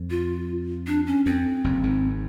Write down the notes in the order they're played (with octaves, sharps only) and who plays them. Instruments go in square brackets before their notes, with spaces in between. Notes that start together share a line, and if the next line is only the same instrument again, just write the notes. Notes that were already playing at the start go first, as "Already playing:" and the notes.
Already playing: [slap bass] F2
[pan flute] F4
D4
C#4
[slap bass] F2 [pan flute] C4
[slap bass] F#1 F#2
G#1 G#2